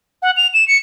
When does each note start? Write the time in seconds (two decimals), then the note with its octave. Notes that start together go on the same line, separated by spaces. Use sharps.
0.22 F#5
0.37 F7
0.54 E7
0.68 C#7